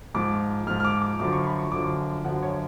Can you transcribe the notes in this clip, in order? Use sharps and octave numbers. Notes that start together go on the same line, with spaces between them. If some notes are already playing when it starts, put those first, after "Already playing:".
G#2 F3 D6
G#2 F3 F6
F6
D6
D6
F#2 D3 F3 D6
C#6
B5
C#6
F#2 D3 F3 D6
F#2 D3 F3 F#5
C#5